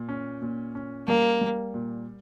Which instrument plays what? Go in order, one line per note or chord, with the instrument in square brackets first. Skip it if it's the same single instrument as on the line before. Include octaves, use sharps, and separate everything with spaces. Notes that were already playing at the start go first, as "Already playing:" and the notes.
Already playing: [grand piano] A#2
C#4
A#2
C#4
[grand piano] G3 [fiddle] A#3
[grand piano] G3
A#2